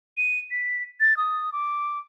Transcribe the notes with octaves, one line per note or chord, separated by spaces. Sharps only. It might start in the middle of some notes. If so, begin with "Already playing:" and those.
D#7
B6
A6
D#6
D6